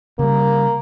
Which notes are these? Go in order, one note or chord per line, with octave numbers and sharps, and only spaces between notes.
C#3 G3 A#3